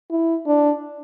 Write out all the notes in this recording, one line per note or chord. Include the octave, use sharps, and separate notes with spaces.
E4
D4